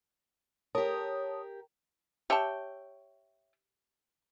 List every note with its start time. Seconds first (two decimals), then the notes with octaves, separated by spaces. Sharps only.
0.75 G4 A#4 C#5 A5 D#6
2.30 G4 C#5 E5 G5 A5